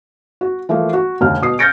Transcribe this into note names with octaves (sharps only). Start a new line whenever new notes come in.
F#4
E3 F3 A3 A#3
F#4
F1 D#2 D3 F6
B2 D#6 C7
F6 G6 A6 A#6 C#7 D7